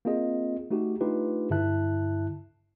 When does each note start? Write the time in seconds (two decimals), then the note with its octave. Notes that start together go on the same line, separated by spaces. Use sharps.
0.05 A#3 C4 F4 G#4 D#5
0.71 A3 D#4 F#4 G4
1.01 A3 D4 D#4 F4 G4 B4
1.50 G2 D3 E4 E5 A5 F#6